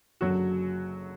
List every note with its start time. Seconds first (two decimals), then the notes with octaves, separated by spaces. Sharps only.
0.21 F#1 F#2 D3 F#3 F#4